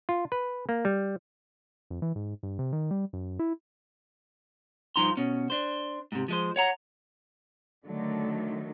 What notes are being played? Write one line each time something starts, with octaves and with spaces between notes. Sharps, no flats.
F4
B4
A#3
G3
F2
E3
G#2
G2
C3
D#3
G3
F#2
E4
G2 F3 D#4 A#5 C6
B2 C#4
D4 C5
G#2 C3
F3 G#3 C5
C#5 F#5 A#5
D3 D#3 F#3 A3